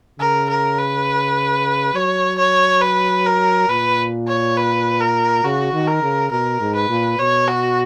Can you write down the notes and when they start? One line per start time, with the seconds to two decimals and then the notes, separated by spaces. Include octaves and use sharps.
0.19 C#3 A#4
0.49 A#4
0.78 B4
1.94 F#3 C#5
2.38 C#5
2.81 B4
3.26 A#4
3.69 A#2 B4
4.27 C#5
4.57 B4
5.00 A#4
5.44 C#3 F#4
5.73 D#3
5.87 A#4
6.02 C#3
6.31 B2 A#4
6.60 G#2
6.75 B4
6.89 A#2
7.19 B2 C#5
7.48 F#4